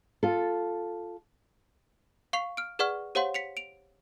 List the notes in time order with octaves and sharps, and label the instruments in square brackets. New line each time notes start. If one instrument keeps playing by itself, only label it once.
[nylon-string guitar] F4 A4
[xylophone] F5 C#6 C7 F7
F6 D7
G#4 B4 D5 F#5 C#6 F6
G4 C5 C#5 F5 F#5 C6
B6 C#7 F7
D7 F7